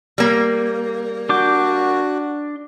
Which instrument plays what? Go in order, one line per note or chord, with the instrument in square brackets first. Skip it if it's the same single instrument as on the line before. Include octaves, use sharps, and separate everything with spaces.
[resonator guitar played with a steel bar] G3 A#3
[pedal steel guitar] D4 D6 G6 [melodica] F#4